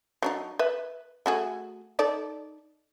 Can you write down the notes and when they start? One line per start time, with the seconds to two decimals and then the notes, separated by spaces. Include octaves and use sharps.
0.22 F#3 D4 D#4
0.59 B4 E5
1.26 A3 F#4 G#4
1.99 D#4 A4 D5